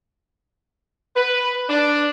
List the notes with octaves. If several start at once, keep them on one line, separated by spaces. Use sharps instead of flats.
B4
D4